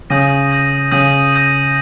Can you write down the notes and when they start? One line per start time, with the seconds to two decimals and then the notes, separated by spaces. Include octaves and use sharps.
0.10 C#3 D#6 G6 A#6 D#7
0.51 D#6 G6 A#6 D#7
0.92 C#3 D#6 G6 A#6 D#7
1.33 D#6 G6 A#6 D#7